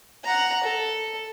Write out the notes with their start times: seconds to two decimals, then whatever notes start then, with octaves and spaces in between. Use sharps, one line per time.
0.24 F#5 A#5
0.63 A4